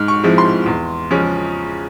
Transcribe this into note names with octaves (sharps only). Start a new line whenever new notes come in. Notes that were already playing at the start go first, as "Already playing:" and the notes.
Already playing: G#2 F6
C#6
F3 G#3 C4 E4
C6
E2
C#3 F3 G#3 C#4